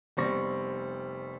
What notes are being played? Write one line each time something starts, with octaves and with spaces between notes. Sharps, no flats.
F1 G3 B3 C4 C#6 A#6